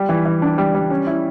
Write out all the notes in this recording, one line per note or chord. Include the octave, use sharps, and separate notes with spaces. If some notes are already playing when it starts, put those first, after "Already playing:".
Already playing: G3
E3
E3
D4
G3
G3
C#4
E4